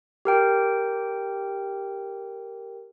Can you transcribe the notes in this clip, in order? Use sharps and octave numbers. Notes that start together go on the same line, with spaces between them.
G4 A#4 G5